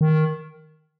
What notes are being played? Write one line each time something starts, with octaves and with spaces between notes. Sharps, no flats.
D#3